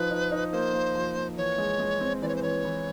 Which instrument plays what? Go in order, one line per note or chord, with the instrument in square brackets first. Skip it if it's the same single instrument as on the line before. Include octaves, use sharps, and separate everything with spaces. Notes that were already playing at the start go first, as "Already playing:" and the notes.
Already playing: [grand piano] F3 D#4 [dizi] B4
[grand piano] D#4
D#4
[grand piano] A#3 [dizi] C5
[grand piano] A#3
F3
A#3
[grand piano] E3 [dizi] C#5
[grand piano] G#3
G#3
C4
[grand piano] E3 [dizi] D5
[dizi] C#5
C5
[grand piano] E3 [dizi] C#5
[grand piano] E3